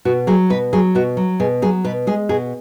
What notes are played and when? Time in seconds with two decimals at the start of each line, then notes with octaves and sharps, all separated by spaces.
0.05 B2 F#4
0.27 F#3 G#4
0.50 B2 B4
0.73 F#3 G#4
0.95 B2 F#4
1.17 F#3
1.40 B2 G#4
1.62 F#3 G#4
1.84 B2 B4
2.07 G#3 G#4
2.29 B2 G#4